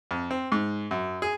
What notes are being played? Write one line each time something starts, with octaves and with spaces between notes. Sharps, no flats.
F2
C4
G#2
F#2
G#4